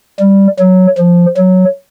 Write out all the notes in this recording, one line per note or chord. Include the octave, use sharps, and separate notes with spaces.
G3
F#3
F3
F#3